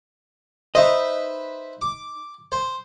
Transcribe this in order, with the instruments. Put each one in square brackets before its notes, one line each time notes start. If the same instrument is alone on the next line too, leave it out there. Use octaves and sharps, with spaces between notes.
[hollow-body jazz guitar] D#4 D#5 [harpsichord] B4 C5 E5
[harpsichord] D6
C5